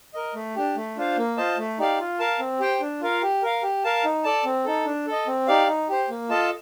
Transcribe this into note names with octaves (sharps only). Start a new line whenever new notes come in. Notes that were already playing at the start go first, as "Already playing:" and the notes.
A#4 D#5
A3
D4 G4
A3
D4 F4 C5 F5
A#3
F4 C5 D#5 A5
A3
D#4 G4 D5 F5
F4
A#4 F5 A5
C4
G4 C5 G5
D4
F4 A#4 F5
G4
A#4 F5
G4
A#4 F5 A5
D#4
A4 D5 A5
C4
D#4 A4
D4
A4 D#5
C4
D#4 G4 D5 F5
D#4
G4 C5
A#3
F4 A4 D#5 A5